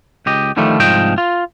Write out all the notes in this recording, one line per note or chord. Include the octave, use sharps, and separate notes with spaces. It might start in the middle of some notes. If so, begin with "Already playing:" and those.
C#2 G4 D#5
D3 D#3 F3 G3 A3
C2 G#2 F3 D#5 G5
F4